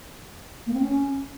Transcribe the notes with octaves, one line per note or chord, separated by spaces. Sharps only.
A#3
C4
C#4